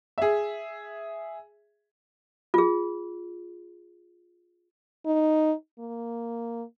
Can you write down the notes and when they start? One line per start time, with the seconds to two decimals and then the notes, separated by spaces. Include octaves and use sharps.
0.18 G#4 E5
2.54 F4 G#4
5.06 D#4
5.79 A#3